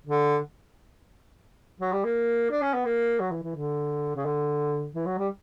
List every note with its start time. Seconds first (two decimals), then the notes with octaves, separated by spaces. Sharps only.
0.06 D3
1.80 F#3
1.92 G3
2.04 A#3
2.50 D4
2.62 C#4
2.74 B3
2.85 A#3
3.20 F#3
3.31 E3
3.43 E3
3.56 D3
4.16 C#3
4.25 D3
4.95 E3
5.06 F#3
5.18 G3